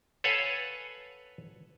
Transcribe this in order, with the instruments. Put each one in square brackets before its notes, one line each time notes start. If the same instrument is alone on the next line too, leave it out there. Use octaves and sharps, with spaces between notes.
[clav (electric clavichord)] A4 B4 C#5 F5 F#5 G#5